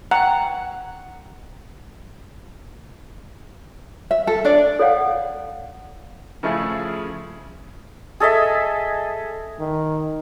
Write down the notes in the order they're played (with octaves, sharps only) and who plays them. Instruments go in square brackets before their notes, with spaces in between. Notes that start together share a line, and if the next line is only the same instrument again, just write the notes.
[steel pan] F#5 [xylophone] G5 A#5
[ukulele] E5
A4
D4 D5
[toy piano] A4 C#5 D5 F5 F#5
[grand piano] C#3 F3 A3 E4 G#4
[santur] G#4 A4 D#5 E5
[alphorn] D#3